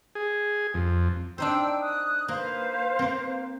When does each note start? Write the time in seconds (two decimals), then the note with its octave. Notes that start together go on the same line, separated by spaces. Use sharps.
0.15 G#4
0.74 F2
1.38 D4 D#4 C5 G5 E6
1.80 D#6 F#6
2.28 A#3 B4 C5 F5
2.99 A#3 C4